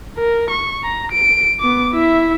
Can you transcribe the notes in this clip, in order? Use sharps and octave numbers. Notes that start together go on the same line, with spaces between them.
A#4
C#6
A#5
D7
B3 D6
E4 E5